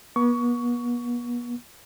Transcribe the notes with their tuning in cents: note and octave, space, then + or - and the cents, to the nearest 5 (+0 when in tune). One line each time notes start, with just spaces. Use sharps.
B3 -40 C#6 +20